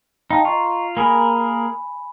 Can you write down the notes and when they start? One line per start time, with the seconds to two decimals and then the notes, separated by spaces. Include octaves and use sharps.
0.31 D#4 F5 G5 A5
0.45 F4 D#5 A#5 C#6
0.97 A#3 G#4 A#4 G#5 B5